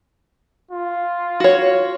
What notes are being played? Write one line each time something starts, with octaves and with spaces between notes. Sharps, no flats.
F4
F#4 C#5